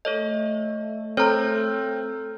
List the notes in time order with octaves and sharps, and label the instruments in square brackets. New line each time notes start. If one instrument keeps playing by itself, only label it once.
[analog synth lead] A3 [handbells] A4 C#5 D#5
[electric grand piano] C4 [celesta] A4 F6 G6 [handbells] C#5 A#5